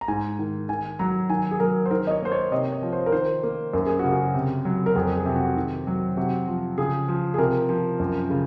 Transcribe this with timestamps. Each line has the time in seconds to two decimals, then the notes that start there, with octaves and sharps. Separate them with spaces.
0.01 A#5
0.08 G#2 G#5
0.39 D#3
0.69 D#3 G#5
0.99 F#3 A#5
1.30 D#3 G#5
1.51 G#4
1.60 F#3 A#4
1.86 C5
1.91 D#3 A#4
2.07 D#5
2.11 C#5
2.22 A#3 C5
2.32 C#5
2.51 C3 D#5
2.72 C#5
2.82 F3
2.93 C5
3.06 A#4
3.12 D#3 C5
3.43 A#3
3.73 F#2 A#4
3.87 G#4
3.99 C#3 F#4
4.12 G#4
4.34 C3
4.65 F#3
4.86 A#4
4.95 F2 G#4
5.16 G#4
5.26 C3
5.36 F#4
5.56 D#3
5.87 F#3
6.17 C3 F#4
6.48 F3
6.78 C#3 G#4
7.08 F3
7.34 G#4
7.38 C3 A#4
7.69 F3
8.00 F#2
8.30 C#3